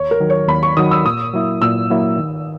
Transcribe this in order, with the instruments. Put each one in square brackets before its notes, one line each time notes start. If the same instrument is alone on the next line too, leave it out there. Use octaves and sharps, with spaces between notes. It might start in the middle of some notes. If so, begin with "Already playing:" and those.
Already playing: [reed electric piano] D#2 [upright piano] C#5
[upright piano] A#4
[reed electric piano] D#3 F#3
[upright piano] C#5
[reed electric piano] D#2 [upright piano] B5
[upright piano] C#6
[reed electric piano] D#3 F#3 [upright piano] D#6
[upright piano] E6
[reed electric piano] A#2 [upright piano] D#6
[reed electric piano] F#3 A#3 E4
[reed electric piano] A#2 [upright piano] E6
[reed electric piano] F#3 A#3 E4
D#3